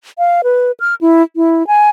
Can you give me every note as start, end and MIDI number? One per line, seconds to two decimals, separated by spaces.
0.18 0.41 77
0.44 0.72 71
0.80 0.95 89
1.01 1.23 64
1.36 1.66 64
1.67 1.89 80